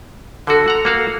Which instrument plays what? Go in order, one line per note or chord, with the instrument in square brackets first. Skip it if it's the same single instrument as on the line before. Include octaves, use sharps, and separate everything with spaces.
[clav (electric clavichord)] D3 F#4 [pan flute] A4
[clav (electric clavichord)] F#5 A#5
A#3 F#4 F5